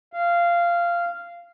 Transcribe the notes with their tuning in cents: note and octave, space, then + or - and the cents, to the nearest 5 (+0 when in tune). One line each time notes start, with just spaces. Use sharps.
F5 -15